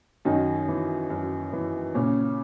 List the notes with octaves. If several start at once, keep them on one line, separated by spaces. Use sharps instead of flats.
F#2 D#3 D#4
E3
F#2
E3
A#2 C#3 C#4